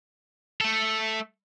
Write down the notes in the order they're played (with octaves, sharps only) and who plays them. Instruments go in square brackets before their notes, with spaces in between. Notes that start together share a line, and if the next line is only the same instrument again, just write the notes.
[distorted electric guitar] A3 A4